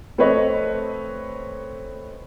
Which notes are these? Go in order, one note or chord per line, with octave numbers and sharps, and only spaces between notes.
A3 C4 A4 B4 C#5 D#5